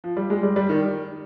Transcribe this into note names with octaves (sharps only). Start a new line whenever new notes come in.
F3
G3
G#3
G3
G3
D#3